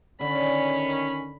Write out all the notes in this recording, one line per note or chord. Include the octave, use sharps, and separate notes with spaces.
D3 D#3 C#4 B5